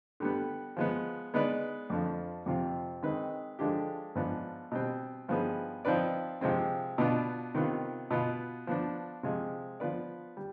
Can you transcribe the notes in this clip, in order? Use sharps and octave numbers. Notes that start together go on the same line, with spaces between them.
D3 G3 B3
F3 G#3 B3
G#3 B3 D#4 B4 D5
F2 D3 F3
F2 C3 F3 C4 F4
D#3 G#3 C4 D#4 B4
D3 F3 G#3 D4 G4
G#2 F3 B3 D4
B2 G3 C4
G2 F3 B3 D#4 G#4
F3 C4 D#4 B4 D5
C3 F3 G#3 C4
B2 B3 D4 F4
C3 D#3 B3 F4
B2 B3 F4
F3 B3 D4
C3 F3 G#3
F3 B3 F4 B4 D5
G3